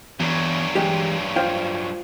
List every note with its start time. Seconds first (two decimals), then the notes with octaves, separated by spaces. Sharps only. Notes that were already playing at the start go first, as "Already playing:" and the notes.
0.20 E2 G2 F#3
0.75 E3 G#3 G4
1.36 F4 C5 G5